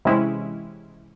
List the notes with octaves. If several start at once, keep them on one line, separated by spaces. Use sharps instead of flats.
C3 E3 G#3 C#4 E4